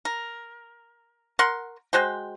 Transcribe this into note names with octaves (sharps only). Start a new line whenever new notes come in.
A#4
A#4 F#5 C6
G#3 F#4 C5 G5